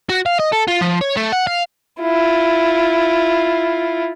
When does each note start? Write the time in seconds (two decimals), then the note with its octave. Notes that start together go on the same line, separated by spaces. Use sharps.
0.10 F#4
0.26 F5
0.39 D#5
0.52 A4
0.68 F4
0.81 F3
1.01 C#5
1.17 A3
1.32 F#5
1.47 F5
2.00 E4 F4